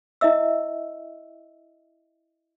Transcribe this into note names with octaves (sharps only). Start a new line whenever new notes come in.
E4 D#5 E5 E6